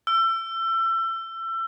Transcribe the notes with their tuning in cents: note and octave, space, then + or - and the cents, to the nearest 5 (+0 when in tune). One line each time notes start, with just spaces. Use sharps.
E6 +30